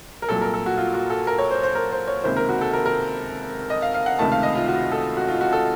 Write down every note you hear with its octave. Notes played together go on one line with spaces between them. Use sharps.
A#4
C2 A#2 F#3 A4
A#4
A4
F#4
F4
F#4
A4
A#4
C#5
C5
C5
A#4
C5
C#5
C#2 C3 D#3 A#3 C5
A#4
F#4
A4
A#4
A#4
D#5
F5
F5
F#5
C#2 C3 D#3 A3 A5
F5
D#5
F4
F#4
A4
F#4
F4
F#4
A4